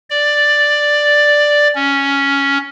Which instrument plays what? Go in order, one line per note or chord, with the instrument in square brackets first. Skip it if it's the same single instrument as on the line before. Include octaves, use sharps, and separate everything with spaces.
[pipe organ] D5
C#4